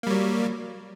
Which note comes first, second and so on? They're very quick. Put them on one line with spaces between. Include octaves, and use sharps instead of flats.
A#3 G3 F#3